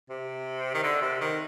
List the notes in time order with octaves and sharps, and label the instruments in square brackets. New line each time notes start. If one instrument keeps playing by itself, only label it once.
[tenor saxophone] C3
D#3
D3
C3
D#3